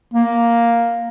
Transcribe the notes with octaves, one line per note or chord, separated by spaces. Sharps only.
A#3